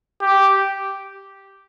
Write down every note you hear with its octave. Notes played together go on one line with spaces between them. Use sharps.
G4